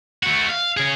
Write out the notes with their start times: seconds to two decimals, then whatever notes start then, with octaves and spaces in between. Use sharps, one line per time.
0.23 A3 F#4
0.49 F5
0.77 C#3 G#4